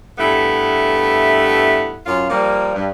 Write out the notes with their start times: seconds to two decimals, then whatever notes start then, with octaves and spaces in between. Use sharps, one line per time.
0.18 G2 A3 B3 E4
2.06 F#2 F4
2.29 F3 G3 A#3
2.75 G2